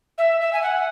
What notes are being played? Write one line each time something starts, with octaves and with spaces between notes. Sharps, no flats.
E5
E5
G#5
F#5